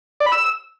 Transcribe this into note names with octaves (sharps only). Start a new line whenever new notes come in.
D5
B5
E6